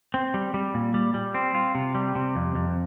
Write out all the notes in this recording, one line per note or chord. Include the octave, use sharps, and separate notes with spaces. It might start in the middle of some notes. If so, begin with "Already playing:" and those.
C4
G3
G3
A#2
G3
G3
C4
F4
C3
G3
C3
F2
F2